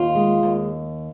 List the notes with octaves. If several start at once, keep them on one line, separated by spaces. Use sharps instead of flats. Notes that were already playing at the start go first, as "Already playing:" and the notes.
Already playing: D#2 F4
G#3
D#2